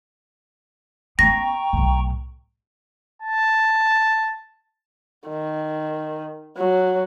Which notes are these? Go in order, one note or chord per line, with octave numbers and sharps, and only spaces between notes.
B3 C#4 G5 A#5 C#6 A#6
B1 A2
A5
D#3
F#3